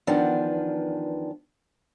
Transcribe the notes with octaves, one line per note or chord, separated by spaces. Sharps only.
E2 D#3 F3 B3 D4